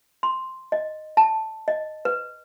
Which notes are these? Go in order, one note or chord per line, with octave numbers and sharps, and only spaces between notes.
C6
D#5
A5
D#5
B4